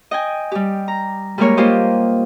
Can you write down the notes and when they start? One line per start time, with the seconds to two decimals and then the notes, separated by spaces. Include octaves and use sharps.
0.11 D#5 G5 G#5
0.52 G3 G4
0.88 A#5
1.38 G3 G#3 A#3 G4 A#4 C#5
1.57 A#3 F4 G4 C5 D#5